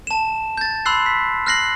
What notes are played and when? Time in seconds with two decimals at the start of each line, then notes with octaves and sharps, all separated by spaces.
0.07 A5 E7
0.57 G6 A6
0.85 B5 C6 E6 F#6 C7
1.06 B6
1.46 F6 F#6 A#6 C7 F#7